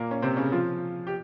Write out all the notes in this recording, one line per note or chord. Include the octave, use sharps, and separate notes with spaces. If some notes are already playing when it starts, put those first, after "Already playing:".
Already playing: A#2 A#3
C#4
C3 C4
C#3 C#4
F3 F4
G4